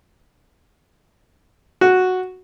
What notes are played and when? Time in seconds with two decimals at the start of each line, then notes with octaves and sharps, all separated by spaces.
1.81 F#4